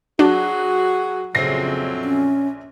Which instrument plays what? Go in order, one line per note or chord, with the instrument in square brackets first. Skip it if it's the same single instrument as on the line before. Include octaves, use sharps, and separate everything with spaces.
[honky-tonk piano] F#3 [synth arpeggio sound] D4 [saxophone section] F#4 G#4
[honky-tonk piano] A#1 A#6 C7 [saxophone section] F2 F#3 C4 [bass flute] C#3
[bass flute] C#4